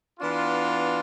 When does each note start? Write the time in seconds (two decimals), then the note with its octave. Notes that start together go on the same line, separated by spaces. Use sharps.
0.19 E3 B3 D4 F4